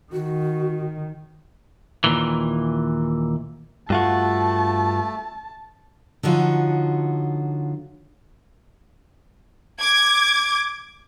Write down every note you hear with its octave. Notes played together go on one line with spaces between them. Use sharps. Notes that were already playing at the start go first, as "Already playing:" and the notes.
D#3 F#4
D#2 A#2 E3
G2 A3 F4 F#4 A5
D3 F3 D#4 F4 F#4 C#5
D6 G#6